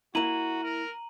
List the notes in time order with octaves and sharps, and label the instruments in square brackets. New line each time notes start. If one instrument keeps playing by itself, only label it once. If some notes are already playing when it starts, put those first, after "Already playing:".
[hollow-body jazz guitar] A#3 E4 [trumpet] F#4 [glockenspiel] A#5 D#7 F#7
[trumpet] A#4